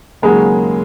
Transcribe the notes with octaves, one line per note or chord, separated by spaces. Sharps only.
D#2 C#3 F#3 G#3 A#3 G#4